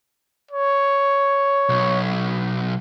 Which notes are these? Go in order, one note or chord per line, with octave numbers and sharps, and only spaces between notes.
C#5
B1